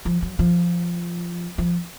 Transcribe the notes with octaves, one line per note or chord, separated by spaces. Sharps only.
F3
F#3
F3
F3